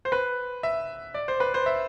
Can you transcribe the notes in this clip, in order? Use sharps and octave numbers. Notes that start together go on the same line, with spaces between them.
C5
B4
E5
D5
C5
B4
C5
E5